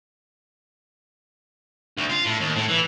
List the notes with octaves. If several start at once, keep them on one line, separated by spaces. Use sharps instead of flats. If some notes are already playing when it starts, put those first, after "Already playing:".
D2
F4
A2
D#2
A2
E3